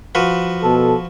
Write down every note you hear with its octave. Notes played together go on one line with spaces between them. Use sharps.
F3 F#4 B4
B2 A4